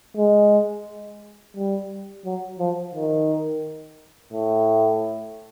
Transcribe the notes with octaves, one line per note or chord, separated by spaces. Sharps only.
G#3
G3
F#3
F3
D#3
A2